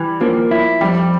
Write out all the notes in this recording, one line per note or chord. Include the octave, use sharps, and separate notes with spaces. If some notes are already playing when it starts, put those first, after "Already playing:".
Already playing: E3 G3
F3 A#3
E4
F2 G3